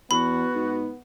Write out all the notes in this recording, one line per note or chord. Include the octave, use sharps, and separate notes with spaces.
E2 B3 F#4 B5
G#2